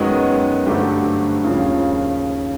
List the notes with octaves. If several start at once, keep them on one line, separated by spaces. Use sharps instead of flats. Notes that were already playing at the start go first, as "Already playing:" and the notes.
Already playing: F#2 D#3 G#3 B3 F#4
G2 D3 F#3 A3 C4 G4
D#2 C#3 F3